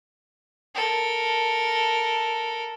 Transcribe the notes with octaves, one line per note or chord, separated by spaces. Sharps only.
A4 A#4